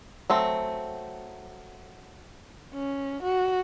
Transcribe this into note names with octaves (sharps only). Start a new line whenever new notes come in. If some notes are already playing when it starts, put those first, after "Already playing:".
F#3 A3 C4
C#4
F#4